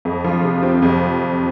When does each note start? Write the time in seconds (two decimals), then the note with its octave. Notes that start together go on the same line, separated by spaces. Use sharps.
0.05 F2
0.24 F3
0.44 C3
0.63 C4
0.82 F2